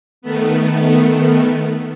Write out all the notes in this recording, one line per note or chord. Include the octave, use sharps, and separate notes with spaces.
D#3 A3 B3